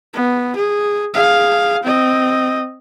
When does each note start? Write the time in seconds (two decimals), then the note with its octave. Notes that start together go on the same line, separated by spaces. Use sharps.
0.14 B3
0.56 G#4
1.14 G#4 F5
1.83 C4 D#5